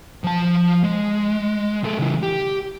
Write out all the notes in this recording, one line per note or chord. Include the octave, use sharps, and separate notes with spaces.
F3 A5
G#3
G#3 A4
C#3 E3
G4